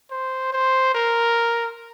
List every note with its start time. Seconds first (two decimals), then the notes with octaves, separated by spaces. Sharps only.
0.11 C5
0.53 C5
0.95 A#4